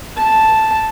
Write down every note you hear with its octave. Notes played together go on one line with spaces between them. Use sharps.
A5